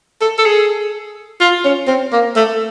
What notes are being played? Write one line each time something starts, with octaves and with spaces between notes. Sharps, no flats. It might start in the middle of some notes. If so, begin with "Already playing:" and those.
A4
A4
G#4
F4
C#4
C4
A#3
A3